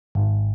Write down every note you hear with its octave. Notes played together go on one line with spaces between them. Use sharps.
G#1